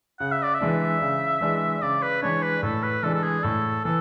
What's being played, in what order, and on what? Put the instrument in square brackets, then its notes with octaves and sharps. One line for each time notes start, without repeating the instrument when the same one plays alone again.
[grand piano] C#3 [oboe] F#5
[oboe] E5
D5
E5
[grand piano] E3 G#3 D4
C#3
E3 G#3 D4
[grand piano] C#3 [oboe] D5
[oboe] B4
[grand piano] E3 G#3 D4 [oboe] C#5
[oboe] B4
[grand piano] A2 [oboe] A4
[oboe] B4
[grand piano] E3 G#3 D4 [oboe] A4
[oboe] A4
G#4
[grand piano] A2 [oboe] A4
[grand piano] E3 [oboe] A4